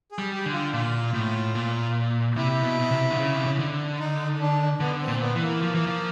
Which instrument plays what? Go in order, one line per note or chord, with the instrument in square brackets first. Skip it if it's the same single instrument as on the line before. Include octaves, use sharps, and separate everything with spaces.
[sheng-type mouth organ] G#4
[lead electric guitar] G3
[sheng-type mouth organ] G4
[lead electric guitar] D3
[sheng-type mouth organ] F4
[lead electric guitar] A#2 [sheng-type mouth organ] F4
[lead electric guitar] A2
A#2
[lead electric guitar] C3 [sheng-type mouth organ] E4
[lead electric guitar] B2
B2
C3
D3
C#3
C3
C#3
D3
[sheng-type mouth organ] D#4
D4
[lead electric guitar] D3 [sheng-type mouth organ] B3
[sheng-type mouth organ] C4
[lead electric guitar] A#2
[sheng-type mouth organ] B3
[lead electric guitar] E3
[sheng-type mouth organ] A#3
[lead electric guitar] F3
E3
F3